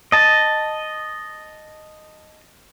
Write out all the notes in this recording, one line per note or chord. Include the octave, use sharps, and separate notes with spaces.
D#5 A5